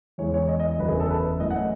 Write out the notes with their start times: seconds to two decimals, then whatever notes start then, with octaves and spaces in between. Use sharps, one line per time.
0.18 E2 C#3 E3 G#3 C#5
0.34 C#5
0.48 D#5
0.60 D#5
0.79 F#1 E2 C#3 F#3 B4
0.89 G#4
1.00 A4
1.10 B4
1.40 F#2 E3 A3 D#5
1.50 F#5